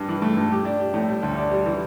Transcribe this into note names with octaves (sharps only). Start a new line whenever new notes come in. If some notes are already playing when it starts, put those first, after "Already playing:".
Already playing: G2
E3
A3
G2
G4
D4
G4
A2
G3
D2
D4
G3
E3